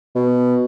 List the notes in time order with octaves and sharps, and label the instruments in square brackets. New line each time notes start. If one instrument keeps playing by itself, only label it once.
[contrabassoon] B2